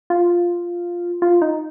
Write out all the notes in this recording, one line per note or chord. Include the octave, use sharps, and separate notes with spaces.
F4
F4
D#4